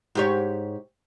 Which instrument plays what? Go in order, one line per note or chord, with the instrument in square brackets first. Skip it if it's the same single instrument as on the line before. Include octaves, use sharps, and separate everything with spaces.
[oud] G#2 G4 C#5